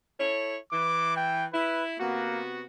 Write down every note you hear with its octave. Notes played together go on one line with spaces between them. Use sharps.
E4 A4 C#5
E3 D6
G5
E4 B4
C3 A#3 B3 F#4